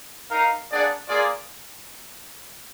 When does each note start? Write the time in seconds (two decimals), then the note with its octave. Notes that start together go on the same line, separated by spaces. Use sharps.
0.29 D#4 A#4 F5
0.68 A#3 D4 G#4 D5 F#5
1.07 A#3 F4 G#4 D5